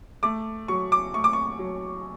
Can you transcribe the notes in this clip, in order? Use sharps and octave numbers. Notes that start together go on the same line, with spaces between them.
A3 D6
F#3 C#6
D6
A3 C#6
D6
C#6
F#3